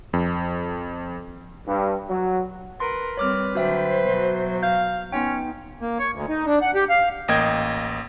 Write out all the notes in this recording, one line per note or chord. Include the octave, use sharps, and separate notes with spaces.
F2
G2
F#3
A#4 B4 C6
G3 C4 C#5 D6 F6
D3 F#3 F#4 C5 E5 G5
B2 F#3
F5 G6
B3 C#4 D#4 G5
A#3
C#5
D2
D#4
D4
F#5
G4
F5
A1 A#3 D#5 G5 G#6